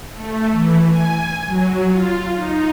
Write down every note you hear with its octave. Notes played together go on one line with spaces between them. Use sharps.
A3
E3
G#5
F#3
F4
D#4